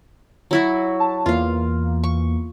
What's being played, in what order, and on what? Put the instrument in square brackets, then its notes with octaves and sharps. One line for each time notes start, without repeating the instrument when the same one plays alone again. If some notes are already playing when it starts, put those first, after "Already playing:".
[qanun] F#3 E4 F#4
[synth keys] A5
[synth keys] E2 E3 A#3 [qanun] F4 F5
[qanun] C#6